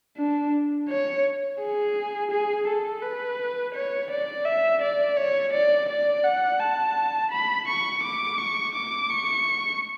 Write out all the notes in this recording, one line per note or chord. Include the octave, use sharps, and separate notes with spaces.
D4
C#5
G#4
G#4
A4
B4
C#5
D5
E5
D5
C#5
D5
D5
F#5
A5
B5
C#6
D6
C#6
D6
C#6